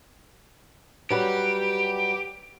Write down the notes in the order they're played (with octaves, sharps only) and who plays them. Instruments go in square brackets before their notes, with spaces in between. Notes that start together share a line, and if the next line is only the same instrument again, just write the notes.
[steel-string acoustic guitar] F#3 G3 B4 [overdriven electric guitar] G4